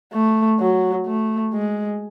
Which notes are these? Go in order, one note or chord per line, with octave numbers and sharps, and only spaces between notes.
A3
F#3
A3
G#3